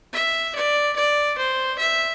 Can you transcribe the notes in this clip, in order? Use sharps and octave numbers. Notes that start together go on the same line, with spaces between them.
E5
D5
D5
C5
E5